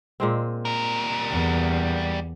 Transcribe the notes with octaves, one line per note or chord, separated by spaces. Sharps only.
A#2 G#3 C4
G3 A#4
E2